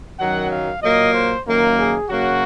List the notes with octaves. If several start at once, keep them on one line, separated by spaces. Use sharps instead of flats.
F#2 D#3 F#3 F#5
F5
A#2 F#3 A#3 D#5
C5
F#2 D#3 A#3
G#4
C#3 F#3 A#3 F#4